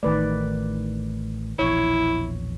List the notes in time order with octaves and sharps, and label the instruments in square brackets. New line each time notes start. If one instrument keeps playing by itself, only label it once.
[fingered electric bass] A1 A3 [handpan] D#3 B4 D5
[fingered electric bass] E1 A#1 E2 [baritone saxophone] E4 [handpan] C#5